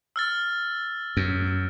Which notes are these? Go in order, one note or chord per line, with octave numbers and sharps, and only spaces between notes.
E6 F6 A6
F#2